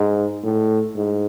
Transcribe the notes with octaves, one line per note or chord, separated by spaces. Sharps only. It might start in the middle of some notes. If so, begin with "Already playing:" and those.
Already playing: G#2
A2
G#2